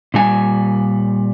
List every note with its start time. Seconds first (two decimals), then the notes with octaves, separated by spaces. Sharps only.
0.14 A#2 G3 G#5